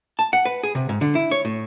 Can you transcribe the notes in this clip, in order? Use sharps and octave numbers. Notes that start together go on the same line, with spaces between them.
A5
F#5
B4
G#4
C3
G#2
D3
E4
C#5
A2